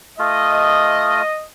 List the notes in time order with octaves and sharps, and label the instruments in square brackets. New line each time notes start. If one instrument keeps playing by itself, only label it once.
[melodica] A3 F4 [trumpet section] D#5